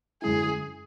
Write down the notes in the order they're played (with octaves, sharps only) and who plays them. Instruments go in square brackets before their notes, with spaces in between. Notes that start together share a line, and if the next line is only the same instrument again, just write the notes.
[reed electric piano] F#2 D3 G#3 C#4 E4 [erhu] G#4